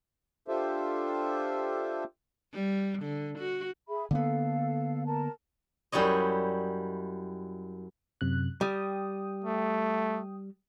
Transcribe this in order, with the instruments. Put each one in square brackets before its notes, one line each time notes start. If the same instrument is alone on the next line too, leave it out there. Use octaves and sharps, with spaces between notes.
[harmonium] D4 F4 G4 A4 C5 E5
[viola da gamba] G3
D3
F#4
[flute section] G#4 E5 B5
[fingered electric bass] D3 A#3 B3 [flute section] A4 F5
[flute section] A#4 A5 A#5
[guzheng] F#2 G3 E4 C#5 D#5
[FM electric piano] F#2 C3 F#6
[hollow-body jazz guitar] G3 [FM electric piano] G5 D#6
[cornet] A3